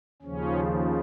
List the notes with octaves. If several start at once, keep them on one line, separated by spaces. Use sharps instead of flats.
D#2 C#3 F3 C#4